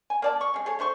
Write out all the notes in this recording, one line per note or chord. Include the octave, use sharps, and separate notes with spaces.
G#5
A#3 D5 A5
C#6
C#3 G#3
G#4 A4 C#5
A3 D4 C5 C#6